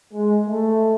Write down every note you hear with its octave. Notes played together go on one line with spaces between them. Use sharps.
G#3
A3